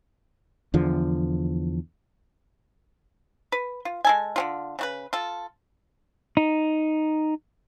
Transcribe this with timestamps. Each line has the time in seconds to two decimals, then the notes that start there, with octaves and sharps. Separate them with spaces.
0.74 E2 D3 F3
3.52 B4
3.85 F4
4.05 G#3 A4 G#5
4.36 D3 C#4 F4
4.79 C#3 F#4 B4
5.13 F4 A4
6.37 D#4